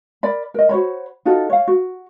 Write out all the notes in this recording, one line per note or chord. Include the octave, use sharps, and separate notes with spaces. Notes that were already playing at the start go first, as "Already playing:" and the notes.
A#4 D5 B5
A#4 D#5
F#4 C5 C#5 B5
D#4 F4 F#4 A4
C#5 F5
F#4